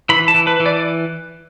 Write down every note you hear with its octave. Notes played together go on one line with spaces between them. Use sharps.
E3 B5
A5
E3
B4
E3
D5